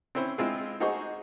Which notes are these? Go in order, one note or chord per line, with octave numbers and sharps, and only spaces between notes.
C4 C#4 E4 C5
G#3 C4 E4 F4 G#4
D#4 F#4 G#4 C5 D#5 C#6